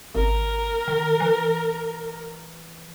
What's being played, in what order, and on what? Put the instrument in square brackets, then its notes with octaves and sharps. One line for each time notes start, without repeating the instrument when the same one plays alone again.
[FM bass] G#1 [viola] A#4
[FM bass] D#3
E3